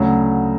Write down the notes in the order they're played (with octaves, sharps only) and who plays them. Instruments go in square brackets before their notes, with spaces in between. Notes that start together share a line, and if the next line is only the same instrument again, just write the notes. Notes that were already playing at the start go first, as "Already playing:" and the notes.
Already playing: [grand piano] D2 C#3 F#3